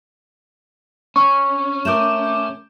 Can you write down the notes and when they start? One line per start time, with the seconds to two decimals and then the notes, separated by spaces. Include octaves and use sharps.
1.16 C#4 C#6
1.85 A3 A#4 D6 G6 E7